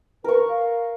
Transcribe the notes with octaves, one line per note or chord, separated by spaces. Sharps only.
A#4 B4 C#6
F5